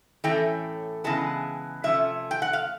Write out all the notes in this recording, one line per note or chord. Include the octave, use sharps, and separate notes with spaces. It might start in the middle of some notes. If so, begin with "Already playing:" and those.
A2 E3 A3 C#4 G5
C#3 E3 G#3 B3 A5
C3 F3 A3 C#4 E5
G5
F#5
F5